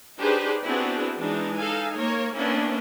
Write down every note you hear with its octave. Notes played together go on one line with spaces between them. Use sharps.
D4 D#4 G4 G#4 B4 C5
B3 C4 D4 E4 F#4 G#4
E3 G#3 D4 D#4
D#4 A4 F5 G#5
A#3 A#4 C#5
A#3 B3 C#4 D4 E4